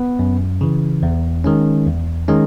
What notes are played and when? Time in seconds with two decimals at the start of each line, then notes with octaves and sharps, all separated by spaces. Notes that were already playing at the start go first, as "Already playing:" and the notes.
Already playing: B3 B4
0.19 F#2
0.61 C#3 E3
1.03 E2
1.44 D#3 G#3 C#4
1.86 E2
2.28 D#3 G#3 C#4